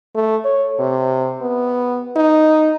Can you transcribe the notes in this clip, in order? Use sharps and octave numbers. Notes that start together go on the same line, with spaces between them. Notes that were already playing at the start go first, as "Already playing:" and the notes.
A3
C#5
C3
B3
D#4